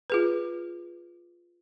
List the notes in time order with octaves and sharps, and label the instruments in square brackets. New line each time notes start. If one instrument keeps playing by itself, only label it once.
[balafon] F4 G#4 B4